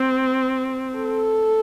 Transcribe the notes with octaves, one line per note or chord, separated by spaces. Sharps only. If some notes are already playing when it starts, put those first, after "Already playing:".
Already playing: C4
A4